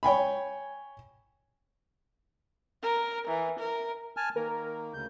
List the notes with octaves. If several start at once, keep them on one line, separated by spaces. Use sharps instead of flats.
C#5 G5 G#5 B5
A#4
E3
A#4
G#5 A5 F6
D#3 A#3 A#4
D2 C#3 G6